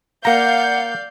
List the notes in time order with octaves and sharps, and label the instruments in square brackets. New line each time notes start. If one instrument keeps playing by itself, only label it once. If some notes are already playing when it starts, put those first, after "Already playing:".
[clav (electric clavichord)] A#3 A#5 [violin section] D5 F5 G6 [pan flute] F#5